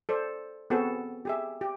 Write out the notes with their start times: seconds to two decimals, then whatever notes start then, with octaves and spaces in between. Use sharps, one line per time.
0.09 A4 C5 D5
0.70 B3 C4 F#4 G#4 A4
1.25 G4 G#4 E5
1.61 G4